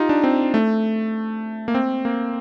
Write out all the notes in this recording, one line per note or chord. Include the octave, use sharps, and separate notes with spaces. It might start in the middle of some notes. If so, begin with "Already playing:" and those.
Already playing: D#4 F4 G4
D4
C4
A3
A#3
C4
A#3